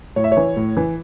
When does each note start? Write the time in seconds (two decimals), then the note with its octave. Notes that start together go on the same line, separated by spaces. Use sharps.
0.16 A2 C#5
0.24 E5
0.32 C#5
0.37 E3
0.57 A2
0.77 E3